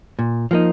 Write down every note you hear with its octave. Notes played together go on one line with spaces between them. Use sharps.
A#2
F3 A#3 D#4